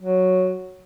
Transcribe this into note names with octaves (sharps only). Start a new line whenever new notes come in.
F#3